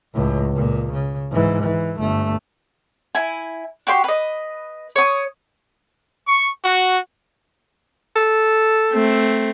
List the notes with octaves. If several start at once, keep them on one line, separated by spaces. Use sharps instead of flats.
C#2 A2
C#2 A#2
C#3
G#2 E3
E3
G1 A3
E4 G#5
F#4 G4 G5 C6
B4 D#5
C#5 D#6
C#6
F#4
A4
A3 C4